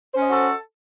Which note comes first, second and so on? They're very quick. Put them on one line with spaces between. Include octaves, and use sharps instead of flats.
C5 C#4 D#5 F#4 A4